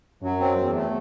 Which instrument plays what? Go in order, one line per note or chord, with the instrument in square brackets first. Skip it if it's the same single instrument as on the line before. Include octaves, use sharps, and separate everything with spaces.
[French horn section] F#2 [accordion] F#3
[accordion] C4
E2
A3